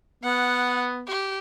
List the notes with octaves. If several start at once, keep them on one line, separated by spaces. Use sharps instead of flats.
B3 F#5
G4